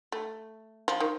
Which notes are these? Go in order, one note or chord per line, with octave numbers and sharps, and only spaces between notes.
A3
F3
D#3